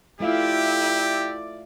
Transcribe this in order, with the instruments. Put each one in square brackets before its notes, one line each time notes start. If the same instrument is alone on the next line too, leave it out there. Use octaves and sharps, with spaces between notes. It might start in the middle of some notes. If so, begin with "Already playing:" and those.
[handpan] A3 F4 F5 [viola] E4 [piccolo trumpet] G4 [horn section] D5